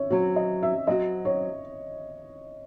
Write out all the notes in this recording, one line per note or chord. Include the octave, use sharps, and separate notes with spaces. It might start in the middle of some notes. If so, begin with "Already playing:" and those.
Already playing: C#5 E5
F#3 C4 F#4 C#5
D#5
E5
F#3 C4 F#4 D#5
C#5